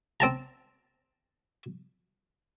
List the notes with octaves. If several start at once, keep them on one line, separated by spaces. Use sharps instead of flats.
C4 A5 A#5